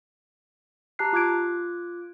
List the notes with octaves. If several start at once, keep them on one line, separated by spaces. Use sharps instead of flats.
G4 A5 A#5 F#6 C7
F4 D6 F#6 G#6 D7